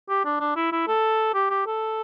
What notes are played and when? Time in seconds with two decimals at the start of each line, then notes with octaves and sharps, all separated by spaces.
0.09 G4
0.25 D4
0.40 D4
0.56 E4
0.72 E4
0.88 A4
1.34 G4
1.50 G4
1.66 A4